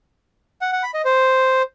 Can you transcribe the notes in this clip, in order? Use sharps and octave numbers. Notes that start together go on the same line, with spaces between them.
F#5
F#5
B5
D#5
C5